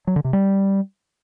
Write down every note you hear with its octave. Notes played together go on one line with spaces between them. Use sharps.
F#3
D3
C3
G3